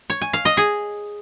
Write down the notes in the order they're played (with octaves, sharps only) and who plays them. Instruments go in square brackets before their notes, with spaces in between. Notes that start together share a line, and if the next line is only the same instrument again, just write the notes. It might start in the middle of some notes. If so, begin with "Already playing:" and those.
[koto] C#5
G#5
F5
D#5
G#4